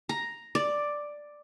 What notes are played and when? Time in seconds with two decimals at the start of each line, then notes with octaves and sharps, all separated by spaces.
0.09 A#5
0.55 D5